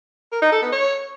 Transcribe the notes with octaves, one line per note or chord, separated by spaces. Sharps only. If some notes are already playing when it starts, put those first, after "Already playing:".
A#4
D#4
A4
B3
C#5